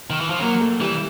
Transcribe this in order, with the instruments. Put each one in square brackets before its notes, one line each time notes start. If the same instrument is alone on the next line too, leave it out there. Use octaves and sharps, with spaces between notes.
[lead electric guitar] D#3
E3
F3
[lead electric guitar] F#3 [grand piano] A#3
[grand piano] A3
[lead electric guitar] E3 [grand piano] G3